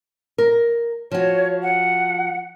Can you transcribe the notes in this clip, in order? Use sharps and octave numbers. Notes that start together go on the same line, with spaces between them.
A#4
F3 F#4 C#5
F#5